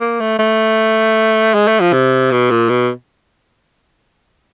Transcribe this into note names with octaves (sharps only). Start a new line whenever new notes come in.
A#3
A3
A3
G#3
A3
F3
C3
B2
A#2
B2